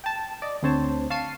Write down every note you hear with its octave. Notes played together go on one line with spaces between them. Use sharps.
G5 A5
D5 D#5
D2 D3 C4 C5 C#5 A5
F5 A5 C#6 C7 D#7